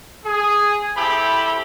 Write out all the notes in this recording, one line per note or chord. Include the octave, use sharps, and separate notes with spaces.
G#4
C4 E4 G4 A4 B5